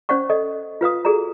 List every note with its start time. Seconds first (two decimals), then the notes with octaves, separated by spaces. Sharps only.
0.09 C#4 C5 D5 F#5 C#6
0.29 A4 D5 D#5
0.81 F4 B4 F5 D#6
1.05 F#4 G#4 A4 D5 A#5